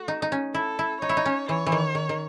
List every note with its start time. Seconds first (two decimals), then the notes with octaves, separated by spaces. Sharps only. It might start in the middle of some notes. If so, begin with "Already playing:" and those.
Already playing: A3 F#4
0.08 D#4
0.22 D#4
0.32 C#4
0.54 E4 A4
0.79 E4
1.02 D#4 C#5
1.09 E4
1.17 D#4
1.26 C#4
1.49 E3 C#5
1.66 E3
1.72 D#3
1.95 D#3
2.09 D#3